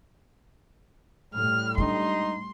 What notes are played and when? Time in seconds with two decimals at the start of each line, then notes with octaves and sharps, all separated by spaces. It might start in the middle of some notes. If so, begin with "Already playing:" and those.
1.35 A2 G3 F6
1.78 G#3 D4 D#4 C6